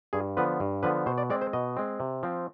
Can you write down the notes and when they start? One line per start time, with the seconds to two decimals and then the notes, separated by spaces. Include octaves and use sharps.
0.13 G2 G#4
0.37 D3 F3 B3 B4
0.60 G2
0.83 D3 F3 B3 B4
1.06 B2 C5
1.18 D5
1.30 G#3 C4 D5
1.41 C5
1.53 B2 D#5
1.77 G#3 C4
2.00 C3
2.23 F3 C4